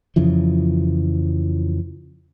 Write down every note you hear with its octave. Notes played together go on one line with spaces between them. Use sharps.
F2 C#3 E3 F3